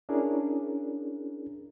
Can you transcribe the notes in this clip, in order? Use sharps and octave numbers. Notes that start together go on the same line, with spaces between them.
C#4 D4 E4 G#4 A#4